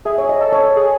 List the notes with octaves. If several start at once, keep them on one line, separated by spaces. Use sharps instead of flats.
G#4 E5
C#5
D#5
A4
C#5
G#4